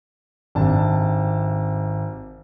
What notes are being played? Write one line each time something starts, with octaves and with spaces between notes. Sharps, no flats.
G#1 C3 D4 A5